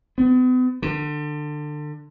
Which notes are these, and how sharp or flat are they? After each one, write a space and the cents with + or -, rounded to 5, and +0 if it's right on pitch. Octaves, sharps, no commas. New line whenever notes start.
B3 +40
D3 +25